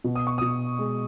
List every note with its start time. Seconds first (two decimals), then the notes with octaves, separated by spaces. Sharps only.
0.04 B2
0.16 D#6
0.27 C#6
0.38 B2 D#6
0.79 G#3